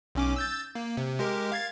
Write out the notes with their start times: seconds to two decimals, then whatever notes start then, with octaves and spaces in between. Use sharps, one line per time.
0.15 B1 C#4 D6
0.36 E6 G6 A6
0.75 A#3
0.97 C3
1.19 G#3 G4 A#4
1.52 F5 G#6 A6